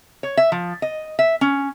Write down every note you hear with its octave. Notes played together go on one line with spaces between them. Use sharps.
C#5
E5
F3
D#5
E5
C#4